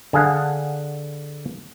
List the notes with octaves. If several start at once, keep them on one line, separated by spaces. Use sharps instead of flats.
D3 G#4 F5 F#5